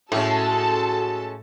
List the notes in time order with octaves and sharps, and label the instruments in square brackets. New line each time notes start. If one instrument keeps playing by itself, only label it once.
[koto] A2 [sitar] G#3 A3 C#4 [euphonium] F#4 [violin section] A4 A5